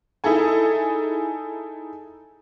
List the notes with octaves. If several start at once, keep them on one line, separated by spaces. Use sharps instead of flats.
D#4 E4 G#4 A4 G#5